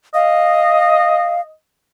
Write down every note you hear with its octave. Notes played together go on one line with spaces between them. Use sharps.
D#5 F5